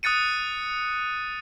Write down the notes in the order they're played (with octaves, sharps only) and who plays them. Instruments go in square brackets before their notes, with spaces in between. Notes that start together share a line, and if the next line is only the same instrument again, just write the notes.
[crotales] D#6 F#6 A6 C#7 D#7